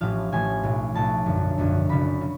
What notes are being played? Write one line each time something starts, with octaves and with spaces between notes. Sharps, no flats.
A1 A2 F3 F5
A1 A2 F3 G#5
B1 A2 F3
B1 A2 F3 A5
G#1 F#2 D3 F3
G#1 F#2 D3 F3
F#1 F#2 C#3 B5
C#3